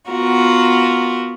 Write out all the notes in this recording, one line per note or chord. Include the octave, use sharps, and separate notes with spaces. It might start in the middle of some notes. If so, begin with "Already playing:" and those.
B3 F4 F#4 A#4